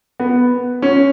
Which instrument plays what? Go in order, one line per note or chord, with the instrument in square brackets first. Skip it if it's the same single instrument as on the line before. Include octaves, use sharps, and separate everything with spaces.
[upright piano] B3
C#4